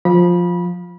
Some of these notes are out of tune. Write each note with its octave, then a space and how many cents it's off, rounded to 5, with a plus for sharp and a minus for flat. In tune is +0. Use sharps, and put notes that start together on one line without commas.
F3 +10 B5 -25